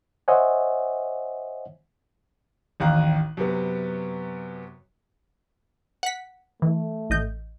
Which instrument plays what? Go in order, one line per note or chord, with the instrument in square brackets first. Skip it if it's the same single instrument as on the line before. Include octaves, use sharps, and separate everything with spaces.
[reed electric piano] C5 C#5 D#5 E5 F#5 G#5
[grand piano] A1 D#2 F5 A#5 F#6
F#2 C3 B3
[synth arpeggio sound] F#5 B6
[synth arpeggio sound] E3 [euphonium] A3
[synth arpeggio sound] A1 D#5 G6